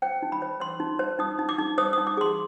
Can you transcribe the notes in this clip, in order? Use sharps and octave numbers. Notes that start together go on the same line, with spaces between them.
C5 G5
D#4
B5
C5
C5 C6
D#4
C5
D#4 D#6
D#4
D6
D#4
C5 D#6
D#4 D#6
D6
G#4 C6